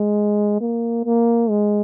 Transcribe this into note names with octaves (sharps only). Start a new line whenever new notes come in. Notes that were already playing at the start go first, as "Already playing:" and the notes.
Already playing: G#3
A#3
A#3
G#3